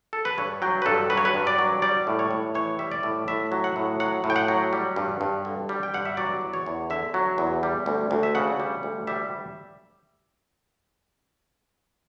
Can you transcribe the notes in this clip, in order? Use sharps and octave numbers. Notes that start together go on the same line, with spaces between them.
A4
B4
G2 C#5
F#3 G5
B4
G2 A4
F#3 B4
C#5
B4
G2
D5
F#3
G3 D5
A2
C#5
A2
E3 C#5
G3 E5
D5
A2
A2 E5
F#3
F#5
A2
F#3 F#5
A2
G5
F#5
F#3
G3
G2
G2
D3
G3
G5
G2 F#5
E5
F#3 D5
E2
C#5
E2
D3 E5
F#3
E2
G3
D2
D2
E5
C#3 F#5
G3
D2
G3 E5